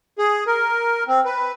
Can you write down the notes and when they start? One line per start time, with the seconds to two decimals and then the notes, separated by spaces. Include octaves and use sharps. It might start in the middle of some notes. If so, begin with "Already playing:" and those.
0.19 G#4
0.47 A#4
1.08 C4
1.25 B4